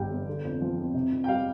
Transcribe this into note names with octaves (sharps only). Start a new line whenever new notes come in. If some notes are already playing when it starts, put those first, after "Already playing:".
Already playing: G1 G2 G3 G5
G1
D3
F2
F3
F2
C3
F2
G5
G3 F5